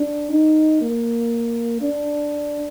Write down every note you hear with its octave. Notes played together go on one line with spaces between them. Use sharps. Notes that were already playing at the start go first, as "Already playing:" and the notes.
Already playing: D4
D#4
A#3
D4